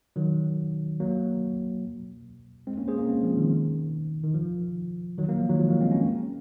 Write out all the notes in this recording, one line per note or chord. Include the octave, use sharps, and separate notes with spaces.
D#3 F#3
F#3 A#3
G#3 C4
A#3 C#4
G#4 C5
A#3 C#4
G#3 C4
F3
D#3
D#3
F3
D#3 F#3
F#3 A#3
F3
D#3 F#3
F3 G#3
F#3 A#3
G#3 C4
A#3 C#4